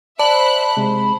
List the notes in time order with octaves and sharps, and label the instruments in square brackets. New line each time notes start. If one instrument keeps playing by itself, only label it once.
[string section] C5 E5 F#6 [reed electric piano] D5 [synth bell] A5 [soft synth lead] B5
[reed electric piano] C3 G#3 [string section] C5